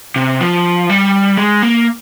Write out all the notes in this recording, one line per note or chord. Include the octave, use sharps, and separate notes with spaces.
C3
F3
G3
G#3
A#3